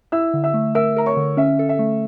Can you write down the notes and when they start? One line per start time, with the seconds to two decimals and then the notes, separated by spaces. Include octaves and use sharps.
0.12 E4 E5 E6
0.34 D3
0.44 E5 E6
0.54 A3
0.75 A#4 E5 E6
0.97 A#4 A#5
1.06 C#5 C#6
1.17 D3
1.37 C#4 E5
1.59 A4
1.69 E5
1.79 A3